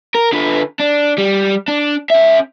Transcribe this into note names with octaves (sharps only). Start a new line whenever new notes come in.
A#4
D3 B4
D4
G3
D4
C#4 E5